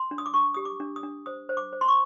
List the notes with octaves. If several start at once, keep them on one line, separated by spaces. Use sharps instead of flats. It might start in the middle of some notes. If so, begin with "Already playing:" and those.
Already playing: C6
D4
D#6
D6
D4 C#6
G4 D#6
D6
D4
D#6
D4
C5 D#6
C5
D6
C5
C6
C#6